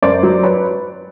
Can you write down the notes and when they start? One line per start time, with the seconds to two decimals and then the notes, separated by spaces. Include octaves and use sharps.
0.02 F#2 C5 D5
0.23 F#3
0.43 B4 C#5